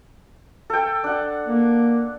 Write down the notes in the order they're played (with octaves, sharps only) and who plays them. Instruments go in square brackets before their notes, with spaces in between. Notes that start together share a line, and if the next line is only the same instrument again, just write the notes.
[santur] A4 G5
D4 F#5
[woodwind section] A#3